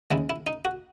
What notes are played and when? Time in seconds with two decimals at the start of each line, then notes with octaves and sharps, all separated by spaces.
0.11 D#2 C#3 G#3 E4
0.30 E4
0.47 D#4
0.65 F#4